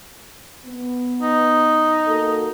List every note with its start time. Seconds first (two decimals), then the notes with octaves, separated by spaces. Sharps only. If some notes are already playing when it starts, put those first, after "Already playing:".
0.65 B3
1.22 D#4
2.07 A#3 F#4 A4